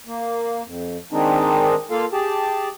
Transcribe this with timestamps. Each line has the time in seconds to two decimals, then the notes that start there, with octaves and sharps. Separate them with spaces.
0.07 A#3
0.65 F2
1.12 D#3 G#3 C4 D4 D#4
1.91 A#3 F4 A4 F5
2.13 G4 G#4 A5